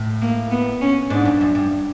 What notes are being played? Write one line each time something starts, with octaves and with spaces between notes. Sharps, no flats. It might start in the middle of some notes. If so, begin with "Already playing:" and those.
Already playing: A2
A#3
B3
C#4
G#2 D4
G2
F#2
G2